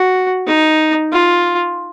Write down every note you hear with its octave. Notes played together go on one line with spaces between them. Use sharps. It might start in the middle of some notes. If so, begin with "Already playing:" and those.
Already playing: F#4
D#4
F4